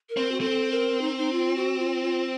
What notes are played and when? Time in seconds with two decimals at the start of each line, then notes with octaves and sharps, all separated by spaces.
0.09 A#4
0.17 C4
0.32 F#4
0.41 C4 A4
0.71 A#4
1.01 D#4
1.19 D#4
1.32 F4
1.56 F#4
1.79 F4
2.03 F4